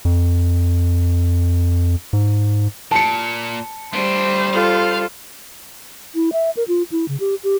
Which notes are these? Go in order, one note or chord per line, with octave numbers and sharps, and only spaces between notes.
F2
G#2
A#2 A5 C#7
G3 A3 D4 C5
F4 A4 F5
E4
E5
A#4
F4
E4
C#3
G4
G4